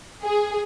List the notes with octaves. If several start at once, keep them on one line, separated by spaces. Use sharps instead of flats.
G#4